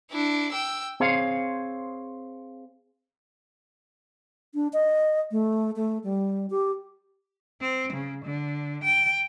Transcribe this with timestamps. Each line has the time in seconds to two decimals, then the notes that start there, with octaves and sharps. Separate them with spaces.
0.11 D4 E4
0.52 G5 E6
1.00 C4 G#4 C5 C#5 F5
4.55 D4
4.73 D#5
5.31 A3
5.76 A3
6.04 G3
6.50 G4
7.60 C4
7.93 C#3
8.25 D3
8.84 G5